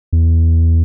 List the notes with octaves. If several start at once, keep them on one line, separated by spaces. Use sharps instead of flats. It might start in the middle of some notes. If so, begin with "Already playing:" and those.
E2